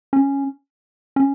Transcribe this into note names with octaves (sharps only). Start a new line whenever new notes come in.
C#4
C#4